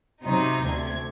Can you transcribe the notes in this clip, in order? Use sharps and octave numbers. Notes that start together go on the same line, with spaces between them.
C3 F#3 D#4
D2 C3 G#6